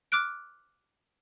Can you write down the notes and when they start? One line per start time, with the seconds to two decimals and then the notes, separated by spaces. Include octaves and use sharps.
0.12 D6 F6 F#6 D7